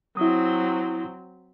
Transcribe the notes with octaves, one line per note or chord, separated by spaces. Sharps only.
F#3 C4 E4 D#6